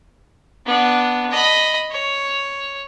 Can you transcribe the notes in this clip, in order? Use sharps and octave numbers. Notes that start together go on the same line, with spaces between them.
B3 D4
D#5 B5
C#5